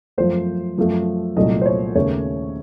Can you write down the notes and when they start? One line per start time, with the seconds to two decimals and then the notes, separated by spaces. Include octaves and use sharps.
0.18 F#2 F3 A3 C5
0.78 F#2 F3 A3
1.36 C2 A#2 F#3 A3 D#5
1.61 C5
1.66 C#5
1.95 D#2 C#3 A3 C#5